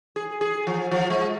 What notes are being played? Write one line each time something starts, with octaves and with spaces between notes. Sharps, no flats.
G#4
G#4
F3
F3
G#3